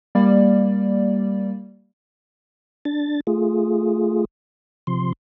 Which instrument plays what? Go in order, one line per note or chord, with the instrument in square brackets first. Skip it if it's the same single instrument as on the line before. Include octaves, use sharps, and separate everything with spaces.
[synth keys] G3 A#3 D5
[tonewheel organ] D4 A6
A3 F4 G#4
C3 F3 C6